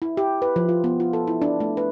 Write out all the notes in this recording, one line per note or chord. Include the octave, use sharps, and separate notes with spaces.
E4
G4
B4
F3
F4
B3
F4
A4
E4
D4
A3
B4